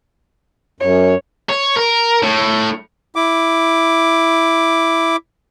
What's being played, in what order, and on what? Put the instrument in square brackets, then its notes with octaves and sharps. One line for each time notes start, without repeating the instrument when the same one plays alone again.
[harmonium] F#2 [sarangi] C#5
[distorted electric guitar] C#5
A#4
A2
[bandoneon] E4 D6